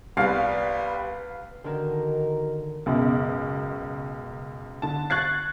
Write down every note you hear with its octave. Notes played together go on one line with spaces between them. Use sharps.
C2 G3 B3 B4 F5
D3 D#3 D#4 F#4 A#4
C#2 F#2 B2
D3 A5
C#6 F#6 G#6 A6 C7